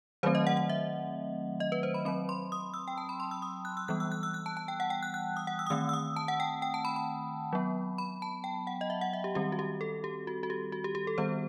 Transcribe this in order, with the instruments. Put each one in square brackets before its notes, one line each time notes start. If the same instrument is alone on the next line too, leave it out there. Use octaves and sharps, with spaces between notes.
[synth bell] D#3 F#3 A3 C4 C5
D#5
F#5
F#5
E5
D#5
B4
C5
B5
F#3 C4 B5
C6
D#6
E6
G5
A5
B5
C6
E6
D#6
F#6
E6
E3 G3 B3 F#6
E6
F#6
E6
F#6
A5
A5
G5
F#5
G5
F#6
F#6
D#6
F#5
E6
D#6
D#3 A3 C4 E6
E6
D#6
A5
F#5
G5
G5
A5
B5
B5
F#3 B3
B5
A5
G5
F#5
D#5
E5
F#5
E5
G4
D#3 G3 C4 G4
F#4
G4
A4
G4
F#4
F#4
G4
F#4
G4
G4
A4
D#3 G3 B3 C5